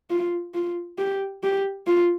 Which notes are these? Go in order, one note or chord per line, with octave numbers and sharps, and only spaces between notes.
F4
F4
G4
G4
F4